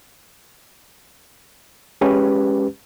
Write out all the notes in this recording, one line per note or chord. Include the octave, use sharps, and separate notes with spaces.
G#3 C#4 G4 B4